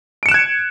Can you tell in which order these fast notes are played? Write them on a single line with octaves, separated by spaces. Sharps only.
D7 C#7 E7 F#6 G#6